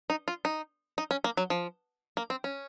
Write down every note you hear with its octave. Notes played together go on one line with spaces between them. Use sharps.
D#4
F4
D#4
D#4
C#4
A#3
F#3
F3
A#3
C4
C#4